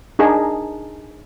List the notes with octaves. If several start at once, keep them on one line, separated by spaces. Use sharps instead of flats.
D4 D#4 G#4 A#4